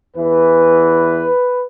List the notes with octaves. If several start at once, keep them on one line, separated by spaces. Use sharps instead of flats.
E2 E3 B4